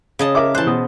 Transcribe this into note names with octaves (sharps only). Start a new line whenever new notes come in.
C#3 D#5 A5
A#4 E5 D6
E3 C5 A5 F#6
B2 D#6